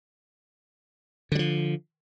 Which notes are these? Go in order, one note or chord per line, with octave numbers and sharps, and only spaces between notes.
D3 F3 F#3